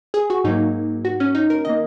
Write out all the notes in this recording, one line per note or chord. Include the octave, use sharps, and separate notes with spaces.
G#4
F#4
G#2 F#3 A#3 D#4
F#4
C#4
D#4
A#4
D#3 A#3 D#5